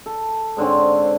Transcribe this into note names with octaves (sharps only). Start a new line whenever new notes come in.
A4
G#2 D3 C4 C#4